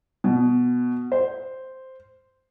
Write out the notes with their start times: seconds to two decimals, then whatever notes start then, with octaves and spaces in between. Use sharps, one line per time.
0.24 B2
1.12 C5